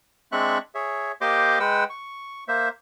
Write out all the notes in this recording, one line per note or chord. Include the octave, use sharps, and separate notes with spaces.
G#3 C4 D4 E5 C#6 F#6
G#4 C#5 E5
A#3 G4 C5 D#5 C6 D6
G#3 B4 F#5 G5 E6
C#6
A#3 C5 E5